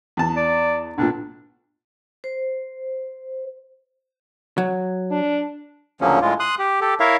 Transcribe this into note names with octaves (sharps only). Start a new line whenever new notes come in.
E2 A5
D5
B1 A#2 D4
C5
F#3
D4
D2 C#3 F3 F#3 A#3 C#4
A2 G#3 F4
C6 D#6 F#6
G4
G4 A4
E4 A#4 C#5 E5 F5